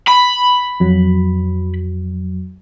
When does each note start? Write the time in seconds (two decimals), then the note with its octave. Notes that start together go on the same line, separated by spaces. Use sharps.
0.08 B5
0.80 F2 F#3